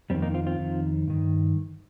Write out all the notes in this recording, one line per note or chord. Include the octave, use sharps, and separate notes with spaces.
F2 D#3 G3 C4
A#3 D#4
C4 F4
C4 F4
F2 D#3
G2 D#3